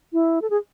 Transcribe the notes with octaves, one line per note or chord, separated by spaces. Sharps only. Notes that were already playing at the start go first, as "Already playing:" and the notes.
E4
A4
G#4